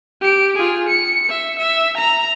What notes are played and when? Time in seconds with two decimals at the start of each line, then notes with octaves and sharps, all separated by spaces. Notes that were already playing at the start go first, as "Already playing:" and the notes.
0.21 G4 D7
0.56 F4 G#4
0.88 C#7
1.29 E5
1.59 E5
1.98 A#5